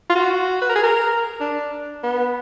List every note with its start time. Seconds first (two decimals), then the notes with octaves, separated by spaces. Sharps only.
0.09 F4
0.15 F#4
0.62 B4
0.69 A#4
0.76 G#4
0.83 A#4
1.41 D4
2.03 B3